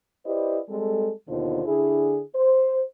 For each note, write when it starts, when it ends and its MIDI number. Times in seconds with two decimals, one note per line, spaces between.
0.26 0.58 64
0.26 0.58 67
0.26 0.58 71
0.26 0.58 72
0.26 0.58 74
0.26 0.58 75
0.69 1.11 55
0.69 1.11 56
0.69 1.11 60
0.69 1.11 69
1.28 1.65 39
1.28 1.65 47
1.28 1.65 50
1.28 1.65 63
1.28 1.65 65
1.28 1.65 72
1.65 2.20 50
1.65 2.20 62
1.65 2.20 64
1.65 2.20 68
2.35 2.83 72